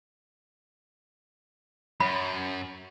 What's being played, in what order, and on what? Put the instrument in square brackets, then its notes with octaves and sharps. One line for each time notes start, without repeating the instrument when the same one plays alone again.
[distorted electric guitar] F#2 [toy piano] B5